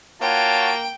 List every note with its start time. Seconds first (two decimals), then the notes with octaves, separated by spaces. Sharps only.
0.22 A#3 F4 F#4 C#5 G5 A5